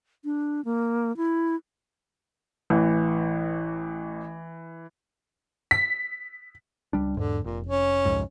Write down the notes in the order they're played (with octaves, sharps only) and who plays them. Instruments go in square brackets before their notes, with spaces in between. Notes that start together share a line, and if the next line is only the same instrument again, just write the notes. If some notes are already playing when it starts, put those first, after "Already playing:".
[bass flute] D4
A#3
E4
[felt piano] A1 [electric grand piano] E3
[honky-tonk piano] B6
[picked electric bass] C#2 G3 D4
[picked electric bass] E2 G#2 [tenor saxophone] D3
[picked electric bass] F1 [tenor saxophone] A#2
[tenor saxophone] C#4
[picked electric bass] C2 F2 G#2